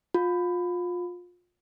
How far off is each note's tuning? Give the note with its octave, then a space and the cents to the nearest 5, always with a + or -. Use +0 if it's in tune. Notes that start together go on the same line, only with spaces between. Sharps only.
F4 +25